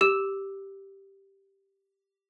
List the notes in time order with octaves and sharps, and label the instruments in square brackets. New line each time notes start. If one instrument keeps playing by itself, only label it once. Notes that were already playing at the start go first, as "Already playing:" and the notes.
[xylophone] G4 E6 E7